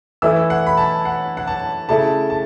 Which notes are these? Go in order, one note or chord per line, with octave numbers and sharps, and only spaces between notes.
E3 A3 E4 E6
F#5
B5
A5
F#5
F#5
A5
C#3 A3 E4 A5
A5